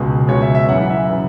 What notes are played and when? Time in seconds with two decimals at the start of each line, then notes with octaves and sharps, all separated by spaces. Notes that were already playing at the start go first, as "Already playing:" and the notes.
Already playing: C#2 B2 G#3
0.28 C#2 B2 G#3 C#5
0.42 E5
0.55 E5
0.68 F#2 C#3 E3 F#5
0.90 E5
1.09 C#3 E3